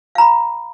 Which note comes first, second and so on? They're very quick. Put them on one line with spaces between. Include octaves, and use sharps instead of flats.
F5 A#5 B5